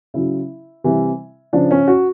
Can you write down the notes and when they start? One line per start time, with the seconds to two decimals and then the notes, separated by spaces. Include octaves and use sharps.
0.14 C#3 F#3 E4
0.84 C3 E3 G3
1.53 C#3 F3 D4
1.71 C#4
1.88 F#4